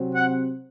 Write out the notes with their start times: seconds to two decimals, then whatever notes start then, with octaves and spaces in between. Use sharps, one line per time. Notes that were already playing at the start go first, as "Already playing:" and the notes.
Already playing: C3 F#3 C4
0.15 F#5